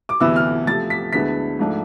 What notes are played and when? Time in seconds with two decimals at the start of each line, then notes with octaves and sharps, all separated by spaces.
0.09 D6
0.20 D2 C3 E3 B3 E4 E6
0.36 F6
0.67 C3 F3 A3 A6
0.90 B6
1.13 D2 D3 G#3 B3 E4 B6
1.59 G#2 F3 A3 D4